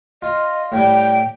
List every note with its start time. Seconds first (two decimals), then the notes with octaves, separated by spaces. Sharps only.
0.22 F4 D#5
0.72 A2 G3 G5